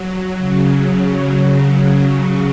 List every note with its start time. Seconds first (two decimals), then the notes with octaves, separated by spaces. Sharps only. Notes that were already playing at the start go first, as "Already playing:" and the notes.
Already playing: F#3
0.38 C#3